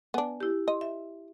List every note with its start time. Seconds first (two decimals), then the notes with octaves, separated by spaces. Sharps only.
0.14 B3 D4 G#5
0.40 E4 G4
0.68 D#5 C6
0.81 E5